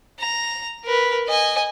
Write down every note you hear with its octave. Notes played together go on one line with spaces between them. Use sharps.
A#5
A#4 B4
D#5 G#5